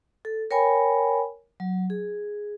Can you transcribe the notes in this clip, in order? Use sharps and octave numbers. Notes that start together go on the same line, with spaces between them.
A4
A#4 C#5 G5 G#5 B5
F#3
G#4